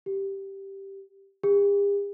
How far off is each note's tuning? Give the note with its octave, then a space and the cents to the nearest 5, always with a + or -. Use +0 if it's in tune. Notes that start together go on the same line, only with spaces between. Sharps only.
G4 -5
G4 +45